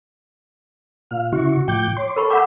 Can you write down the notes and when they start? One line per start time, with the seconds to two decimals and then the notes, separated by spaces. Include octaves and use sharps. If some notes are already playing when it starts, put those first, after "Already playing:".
1.11 A#2 F5
1.33 C#3 E4 F#4 C#6
1.68 A2 F3 G5 D6 G6
1.97 C#5 C6
2.16 A4 A#4 B5 C#6
2.30 F#5 G5 B5 D6 E6